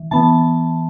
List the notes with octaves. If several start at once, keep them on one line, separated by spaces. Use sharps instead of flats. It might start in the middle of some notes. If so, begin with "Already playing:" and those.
Already playing: E3
E3 B3 A5